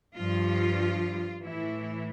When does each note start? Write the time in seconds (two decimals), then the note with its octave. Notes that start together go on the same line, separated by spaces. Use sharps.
0.17 G2 F3 F4
1.42 A2 E3 E4